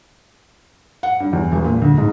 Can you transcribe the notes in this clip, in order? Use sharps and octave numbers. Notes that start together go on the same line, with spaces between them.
F#5
G2
E2
E1
A#2
D2
G#2